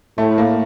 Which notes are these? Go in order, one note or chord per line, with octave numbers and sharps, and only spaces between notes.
A2 A3
A#3